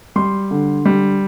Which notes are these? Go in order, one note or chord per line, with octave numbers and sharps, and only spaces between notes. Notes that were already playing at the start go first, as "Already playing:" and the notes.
G3 C6
D3
G3